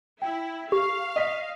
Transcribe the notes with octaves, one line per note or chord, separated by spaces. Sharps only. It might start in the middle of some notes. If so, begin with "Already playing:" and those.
E4 G5
G4 F5 C#6
D#5 B6